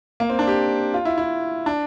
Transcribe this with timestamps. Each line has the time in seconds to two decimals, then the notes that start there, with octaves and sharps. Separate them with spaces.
0.20 A#3
0.30 C4
0.39 D4
0.48 G4
0.94 F4
1.05 E4
1.18 E4
1.66 D4